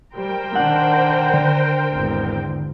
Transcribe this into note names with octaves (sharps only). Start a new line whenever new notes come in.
G3 A#4 C5 G5
D#3 D4 F#5
D3
G#1 E2